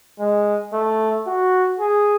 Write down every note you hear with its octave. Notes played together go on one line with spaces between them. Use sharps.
G#3
A3
F#4
G#4